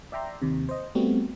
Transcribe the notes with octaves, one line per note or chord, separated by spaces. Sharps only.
D5 E5 G5 A#5 C6
D#2 C3
C5 D#5
G3 A3 B3 C4 F#4